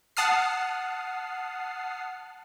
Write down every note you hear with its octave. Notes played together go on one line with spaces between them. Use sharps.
F#5 A5 D#6 F6 C7